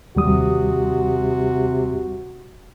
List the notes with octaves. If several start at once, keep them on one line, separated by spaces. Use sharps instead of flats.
D#2 C3 G3 F#4 D#6